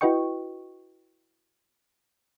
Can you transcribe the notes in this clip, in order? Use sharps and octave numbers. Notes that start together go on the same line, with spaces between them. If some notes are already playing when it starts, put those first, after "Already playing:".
E4 F#4 B4 D#5 G5 C#6